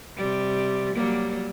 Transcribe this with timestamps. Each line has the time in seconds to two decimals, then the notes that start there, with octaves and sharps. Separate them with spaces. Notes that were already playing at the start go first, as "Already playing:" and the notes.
0.16 C3 G3
0.95 F#3 G3 A#3